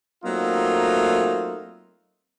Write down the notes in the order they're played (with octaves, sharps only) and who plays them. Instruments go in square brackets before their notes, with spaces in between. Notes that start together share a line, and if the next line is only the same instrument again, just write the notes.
[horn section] F#3 A3 A#3 C4 D#4 F4